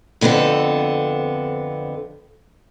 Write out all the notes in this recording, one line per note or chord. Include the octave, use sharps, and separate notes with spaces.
F2 D3 B3 C4 A4